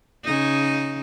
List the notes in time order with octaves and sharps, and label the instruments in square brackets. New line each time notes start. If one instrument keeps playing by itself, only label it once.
[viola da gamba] C#3 D#4